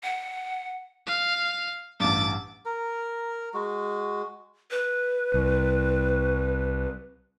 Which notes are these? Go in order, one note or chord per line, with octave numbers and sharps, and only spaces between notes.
F#5
F5
A1 G2 D6 A6
A#4
G#3 F#4
B4
C2